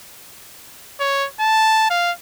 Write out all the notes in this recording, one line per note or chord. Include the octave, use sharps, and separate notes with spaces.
C#5
A5
F5